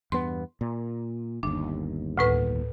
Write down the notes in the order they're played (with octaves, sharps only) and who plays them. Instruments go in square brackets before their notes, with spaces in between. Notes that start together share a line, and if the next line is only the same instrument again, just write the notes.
[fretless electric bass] E2 G2 B3 [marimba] C6
[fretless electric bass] A#2
[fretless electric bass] G1 D#2 [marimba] D4
[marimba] D2 A2 B4